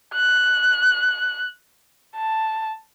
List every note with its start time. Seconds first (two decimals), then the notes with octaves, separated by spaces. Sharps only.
0.14 F#6
2.16 A5